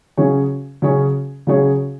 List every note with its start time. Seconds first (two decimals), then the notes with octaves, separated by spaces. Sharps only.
0.17 C#3 F#3 C#4 G#4 C#5
0.82 C#3 F#3 C#4 G#4 C#5
1.47 C#3 F#3 C#4 G#4 C#5